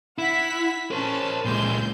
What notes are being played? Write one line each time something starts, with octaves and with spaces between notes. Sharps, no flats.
E4 F#5 B6
C#4 A#4 C5 A5
C#2 A#2 G#3 C6 G6